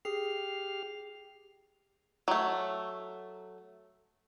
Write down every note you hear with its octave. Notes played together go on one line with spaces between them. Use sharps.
G4 G#4 F6 C7
F#3 A3